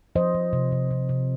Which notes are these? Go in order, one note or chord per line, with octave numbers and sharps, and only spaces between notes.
F3 C5 D#5
F3
C3
C3
C3
C3